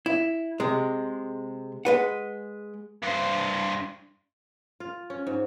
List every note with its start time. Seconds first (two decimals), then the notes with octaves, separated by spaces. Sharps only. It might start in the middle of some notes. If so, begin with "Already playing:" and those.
0.06 E4
0.60 C3 G#3
1.85 G#3 B4 F#5
3.03 G2 C5
4.80 F4
5.10 C#4
5.27 G#2